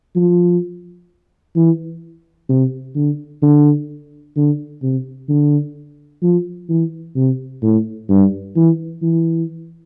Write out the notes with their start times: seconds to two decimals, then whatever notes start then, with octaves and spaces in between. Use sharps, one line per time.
0.16 F3
1.56 E3
2.50 C3
2.96 D3
3.43 D3
4.37 D3
4.83 C3
5.29 D3
6.23 F3
6.69 E3
7.16 C3
7.63 A2
8.09 G2
8.56 E3
9.02 E3